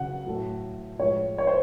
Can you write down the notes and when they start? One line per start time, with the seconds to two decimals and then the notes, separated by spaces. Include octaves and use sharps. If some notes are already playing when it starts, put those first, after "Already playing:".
Already playing: C#3 F#3 F#5
0.26 A2 F#3 A3
0.99 A2 F3 G#3 C#5
1.38 C#5
1.47 C5